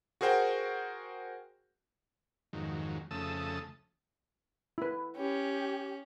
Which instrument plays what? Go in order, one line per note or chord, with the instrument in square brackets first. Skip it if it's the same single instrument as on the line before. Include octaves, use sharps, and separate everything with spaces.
[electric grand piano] F#4 G#4 A#4 C5 F#5 G5
[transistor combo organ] F2 G#2 D#3 F#3
F2 C#3 A3 A5 D#6 E6
[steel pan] E4 B4
[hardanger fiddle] C#4 [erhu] G4